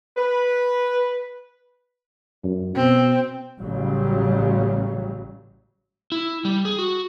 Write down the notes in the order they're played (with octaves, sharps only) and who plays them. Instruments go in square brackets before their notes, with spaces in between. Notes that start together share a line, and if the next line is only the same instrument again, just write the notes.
[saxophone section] B4
[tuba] F#2
[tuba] B2 [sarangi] C4
[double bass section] A1 C#3 F#3 G3
[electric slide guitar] E4
G3
G#4
F#4